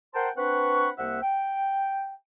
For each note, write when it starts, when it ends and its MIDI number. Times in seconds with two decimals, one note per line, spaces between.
0.14 0.29 70
0.14 0.29 72
0.14 0.29 78
0.14 0.29 79
0.14 0.29 81
0.14 0.29 84
0.37 0.89 60
0.37 0.89 62
0.37 0.89 71
0.37 0.89 78
0.37 0.89 83
0.37 0.89 85
0.98 1.19 36
0.98 1.19 58
0.98 1.19 72
0.98 1.19 76
0.98 1.19 78
1.22 2.14 79